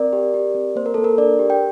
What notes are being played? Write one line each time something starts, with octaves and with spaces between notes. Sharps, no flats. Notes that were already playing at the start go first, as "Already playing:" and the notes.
Already playing: C4 A#4 D5
G4
G4
C4
A#3 C5
A#4
A#3 A4
A#4
D4 A#4 D5
G4
G5